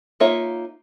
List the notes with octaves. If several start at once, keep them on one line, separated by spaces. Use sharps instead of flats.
A#3 D#4 F4 C#5 E5